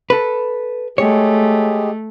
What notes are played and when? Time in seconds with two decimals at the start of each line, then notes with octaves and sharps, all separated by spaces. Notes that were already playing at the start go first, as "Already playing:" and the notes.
0.10 A4 B4
0.98 G#3 A3 G4 G#4 C#5